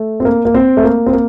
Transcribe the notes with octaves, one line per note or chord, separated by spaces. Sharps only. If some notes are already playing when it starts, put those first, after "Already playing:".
Already playing: A3
C4
A#3
A#3
C4
A3
A#3
C4
A#3